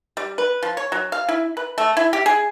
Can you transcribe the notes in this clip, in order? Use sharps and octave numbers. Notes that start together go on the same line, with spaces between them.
G3
B4
F3
C#5
F#3
F5
E4
B4
A3
E4
G4
G#4